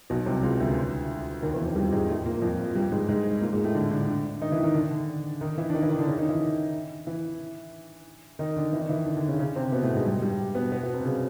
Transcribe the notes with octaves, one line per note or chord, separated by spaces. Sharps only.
B1 B2
C2 C3
C#2 C#3
D2 D3
D#2 D#3
E2 E3
F2 F3
G2 G3
G#2 G#3
A2 A3
A#2 A#3
F2 F3
G2 G3
G#2 G#3
G#2 G#3
A#2 A#3
G#2 G#3
A2 A3
D3 D4
D3 D4
D3 D4
D#3 D#4
E3 E4
D#3 D#4
D3 D4
D3 D4
D#3 D#4
E3 E4
D4
D#3 D#4
E3 E4
D#3 D#4
D3 D4
C#3 C#4
D#3 D#4
E3 E4
E3 E4
D#3 D#4
D3 D4
E3 E4
D#3 D#4
E3 E4
D3 D4
D3 D4
C#3 C#4
C#3 C#4
C3 C4
B2 B3
A2 A3
G#2 G#3
G2 G3
G2 G3
B2 B3
B2 B3
B2 B3
C3 C4
C#3 C#4